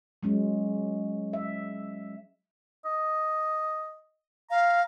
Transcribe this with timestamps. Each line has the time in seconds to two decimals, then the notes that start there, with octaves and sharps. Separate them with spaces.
0.23 F#3 G#3 C#4
1.33 E5
2.86 D#5
4.51 F5 A#5